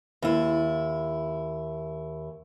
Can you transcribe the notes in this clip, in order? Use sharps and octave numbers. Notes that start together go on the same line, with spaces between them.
D#2 E4